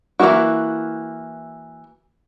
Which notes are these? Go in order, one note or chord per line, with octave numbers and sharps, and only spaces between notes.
E3 A3 A#3 E4 F#4